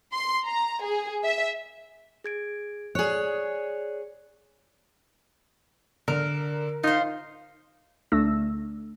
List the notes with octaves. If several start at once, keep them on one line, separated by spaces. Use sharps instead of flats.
C6
A#5
G#4
E5
G#4 G#6 D7
G#4 C#5 D5 F#6
D3 A#4
D#4 F4 C5
D2 A3 D4 E6 A#6